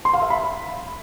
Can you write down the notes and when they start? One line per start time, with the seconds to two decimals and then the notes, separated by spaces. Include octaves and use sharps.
0.05 C6
0.14 F5
0.22 E5
0.30 B5